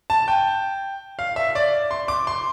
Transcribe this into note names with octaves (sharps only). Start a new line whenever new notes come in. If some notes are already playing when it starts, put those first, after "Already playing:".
A5
G5
F5
E5
D5
C6
D6
C6